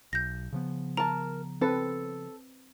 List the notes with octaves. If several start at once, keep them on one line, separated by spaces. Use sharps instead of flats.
B1 G6 A#6
C#3 F3 B3
A#4 A5 A#5
C4 A4 B4